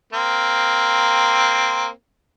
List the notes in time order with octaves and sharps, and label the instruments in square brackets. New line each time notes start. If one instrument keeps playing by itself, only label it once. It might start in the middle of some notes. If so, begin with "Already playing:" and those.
[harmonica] A#3 C4